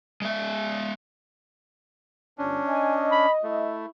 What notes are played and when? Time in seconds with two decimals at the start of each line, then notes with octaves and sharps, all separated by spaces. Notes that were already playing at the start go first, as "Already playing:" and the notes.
0.22 G#3 E5
2.38 G1 C#4 D4
2.68 D#5 G#5
3.11 B5
3.44 A3 E4